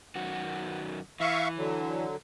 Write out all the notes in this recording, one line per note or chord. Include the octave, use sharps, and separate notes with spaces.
F#2 D#3 F#4
E3 E5 F5 C#6
D3 F#3